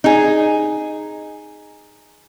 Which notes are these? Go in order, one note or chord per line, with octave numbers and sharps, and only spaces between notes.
D#4 G#4